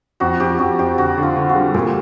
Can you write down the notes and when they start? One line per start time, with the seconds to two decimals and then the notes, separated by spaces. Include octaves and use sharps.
0.20 F2 F#4
0.40 F2 G4
0.59 F2 F#4
0.79 F2 G4
0.97 D3 F#4
1.17 D3
1.23 F4
1.37 D3
1.49 F#4
1.55 G3
1.74 A#2 G4